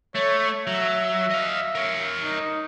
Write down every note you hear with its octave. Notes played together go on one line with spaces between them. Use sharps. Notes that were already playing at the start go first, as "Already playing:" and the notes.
A3 C#5
F#3 E5
D#5 F5
A#4 C#5
D#4